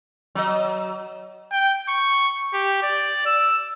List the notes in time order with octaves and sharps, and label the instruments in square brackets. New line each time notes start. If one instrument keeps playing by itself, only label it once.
[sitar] F#3 D#5
[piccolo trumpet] G5
C#6
G4
D5
E6